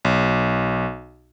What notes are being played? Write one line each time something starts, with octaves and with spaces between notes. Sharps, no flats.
B1